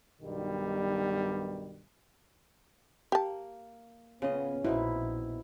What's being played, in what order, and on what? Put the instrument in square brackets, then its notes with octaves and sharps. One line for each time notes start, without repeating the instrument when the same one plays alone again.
[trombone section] B1 G2 B2 D#3 G3
[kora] A#3 [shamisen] G4 A5
[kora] C#3 F4 D#5 [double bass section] B3 C#4
[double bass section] A#1 [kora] B2 C4 D#4 [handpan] E4